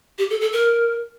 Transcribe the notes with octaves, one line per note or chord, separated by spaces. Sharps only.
G4
A4
A4
A#4